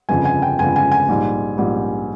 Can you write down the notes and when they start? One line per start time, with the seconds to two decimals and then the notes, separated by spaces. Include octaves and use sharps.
0.09 G1 F2 C#3 G#5
0.25 G#5
0.42 G5
0.58 G1 F2 C#3 G#5
0.76 G#5
0.91 G#5
1.09 A#1 G#2 G3
1.58 A#1 G#2 G3